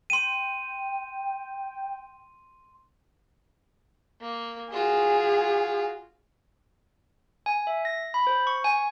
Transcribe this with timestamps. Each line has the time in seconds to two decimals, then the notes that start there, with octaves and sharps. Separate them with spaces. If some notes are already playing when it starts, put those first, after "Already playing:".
0.10 G5 C6 D#7
4.21 A#3
4.72 F4 F#4 G#4
7.46 G#5
7.67 E5
7.85 A#6
8.14 B5
8.27 C5
8.47 C#6
8.64 G#5